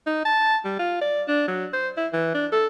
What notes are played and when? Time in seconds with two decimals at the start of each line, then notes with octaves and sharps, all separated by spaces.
0.07 D#4
0.25 A5
0.65 G3
0.79 F4
1.01 D5
1.28 D4
1.48 F#3
1.74 C5
1.97 E4
2.13 E3
2.35 D4
2.52 A4